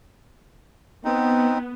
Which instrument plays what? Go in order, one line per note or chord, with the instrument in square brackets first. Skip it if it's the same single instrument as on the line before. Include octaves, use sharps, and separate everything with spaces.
[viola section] B3 [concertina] C4 D#4